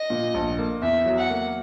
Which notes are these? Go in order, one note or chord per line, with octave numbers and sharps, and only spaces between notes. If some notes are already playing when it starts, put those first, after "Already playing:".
Already playing: D#5
A#2
A#1
A#3
E2 E5
F#3
F#5
A#3